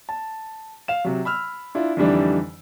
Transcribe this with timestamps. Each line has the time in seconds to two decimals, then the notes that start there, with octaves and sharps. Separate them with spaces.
0.09 A5
0.88 F5 E7
1.05 C3 F#3
1.25 B5 E6 F6
1.75 D4 E4 F4
1.97 F2 D3 E3 G3 D4 D#4